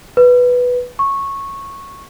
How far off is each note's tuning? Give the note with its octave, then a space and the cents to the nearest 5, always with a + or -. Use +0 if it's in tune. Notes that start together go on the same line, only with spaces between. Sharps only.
B4 +0
C#6 -10